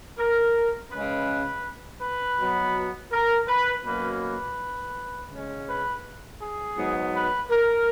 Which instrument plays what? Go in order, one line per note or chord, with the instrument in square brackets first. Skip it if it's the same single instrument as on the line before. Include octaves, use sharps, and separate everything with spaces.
[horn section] A#4
C#3 G#3 C#4 B4
B4
B2 F#3 B3
A#4
B4
B2 F#3 A#3 C#4 B4
B4
C#3 G#3 C#4
B4
G#4
G#2 F#3 B3
B4
A#4